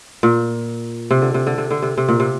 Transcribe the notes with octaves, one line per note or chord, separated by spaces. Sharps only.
A#2
C3
D3
C3
D3
C3
D3
C3
C3
A#2
C3